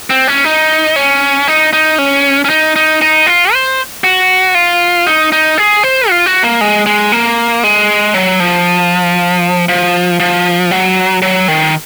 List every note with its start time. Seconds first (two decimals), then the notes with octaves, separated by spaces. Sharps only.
0.10 C4
0.27 C#4
0.44 D#4
0.96 C#4
1.48 D#4
1.73 D#4
1.98 C#4
2.45 C#4
2.50 D#4
2.76 D#4
3.01 D#4
3.26 F4
3.53 C5
4.04 F#4
4.55 F4
5.07 D#4
5.32 D#4
5.58 G#4
5.83 C5
6.09 F4
6.26 F#4
6.44 A#3
6.61 G#3
6.86 G#3
7.12 A#3
7.63 G#3
8.14 F#3
8.40 F3
9.68 F3
10.20 F3
10.71 F#3
11.22 F#3
11.48 D#3